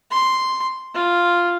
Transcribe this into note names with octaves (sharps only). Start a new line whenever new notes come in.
C6
F4